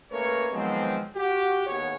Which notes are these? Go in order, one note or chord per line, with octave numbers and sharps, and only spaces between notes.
A3 A#3 C#4 A#4 B4 C#5
D#3 F3 F#3 G#3 B3 C4
F#4 G4
D#2 B3 F#4 G#4 C#5